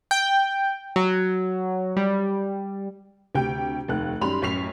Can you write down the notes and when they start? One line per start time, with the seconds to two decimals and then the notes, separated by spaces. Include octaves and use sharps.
0.11 G5
0.96 F#3
1.97 G3
3.35 D2 C3 G4 G5 G6 D7
3.88 F1 D#2 A3 F#6
4.21 F#2 D#3 G3 B5 C6 F7
4.42 A1 F#2 C#6 B6 C7 F7